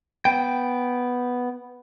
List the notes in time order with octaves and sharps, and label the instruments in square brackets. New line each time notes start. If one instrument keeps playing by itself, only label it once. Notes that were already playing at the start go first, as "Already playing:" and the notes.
[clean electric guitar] B3 G5